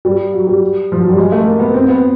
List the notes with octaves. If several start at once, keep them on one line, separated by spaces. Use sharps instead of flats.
G3
F#3
G3
F3
F#3
G3
G#3
A3
A#3
B3
C4
B3